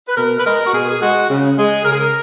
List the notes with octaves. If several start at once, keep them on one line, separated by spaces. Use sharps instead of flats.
B4
B2 A#4
B4
G#3 A#4
F#4
B2 G#4
G#4
G#3 F#4
C#3
G#3 G#4
C#3 A#4
G#4
A#4